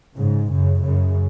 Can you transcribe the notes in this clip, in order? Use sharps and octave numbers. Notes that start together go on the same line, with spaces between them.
G#2 C#3
F#2 C#3
F#2 C#3